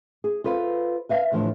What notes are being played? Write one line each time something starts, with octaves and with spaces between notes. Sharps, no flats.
G#4
F4 A4 B4 C5 F5
B4 E5 F5
A2 D3 E3 F3